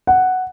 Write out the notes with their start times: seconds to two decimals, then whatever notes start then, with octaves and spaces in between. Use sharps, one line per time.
0.07 F#5